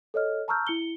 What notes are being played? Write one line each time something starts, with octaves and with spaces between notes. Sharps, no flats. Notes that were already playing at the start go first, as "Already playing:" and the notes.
A4 C#5 D#5 F6
A5 A#5 C#6 E6 F6 G6
E4 C#7 G7